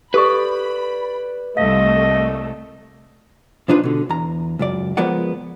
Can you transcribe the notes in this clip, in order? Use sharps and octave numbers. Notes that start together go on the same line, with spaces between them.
G4 A4 B4 D5 B5 C#6
C2 A3 D#5 F5
A#2 F3 D4 D#4 F4 B4
B2 D3
E2 A#5
C#2 F#2 D5
F3 G#3 B3 A#4 D5 F#5